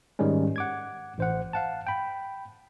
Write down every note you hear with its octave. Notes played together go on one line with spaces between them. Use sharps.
G#2 D#3 G3 G#3 C#4
F#5 D6 G#6
A1 C5 F#5
F5 F#5 A5
G5 B5